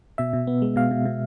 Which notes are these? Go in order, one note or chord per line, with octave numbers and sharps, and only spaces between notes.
B2 E5
B2
B3
G#3
B2 F5
B2
B2